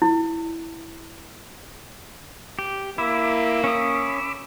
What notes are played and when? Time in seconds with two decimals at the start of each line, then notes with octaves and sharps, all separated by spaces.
0.02 E4
2.59 G4
2.98 A#3 E4 B5 D6 E6
3.64 C#4 D#6